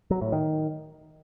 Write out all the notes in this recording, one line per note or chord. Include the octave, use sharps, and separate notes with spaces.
F#3
A2
D#3